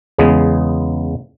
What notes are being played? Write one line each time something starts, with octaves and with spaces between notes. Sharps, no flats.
E2 C#3 G#3 B3